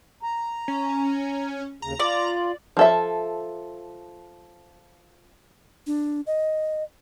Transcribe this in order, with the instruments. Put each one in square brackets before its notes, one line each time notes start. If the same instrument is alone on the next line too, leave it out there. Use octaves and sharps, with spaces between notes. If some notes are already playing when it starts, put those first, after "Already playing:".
[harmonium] A#5
[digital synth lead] C#4
[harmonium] D#2 C#3 [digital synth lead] A#5
[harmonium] F4 [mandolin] D5
[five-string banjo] F3 A4 E5
[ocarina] D4
D#5